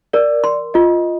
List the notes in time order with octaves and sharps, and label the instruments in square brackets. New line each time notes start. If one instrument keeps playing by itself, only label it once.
[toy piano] A#4 [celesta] D5
[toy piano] C6
[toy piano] F4 [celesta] D#5